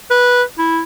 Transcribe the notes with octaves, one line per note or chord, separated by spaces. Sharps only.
B4
E4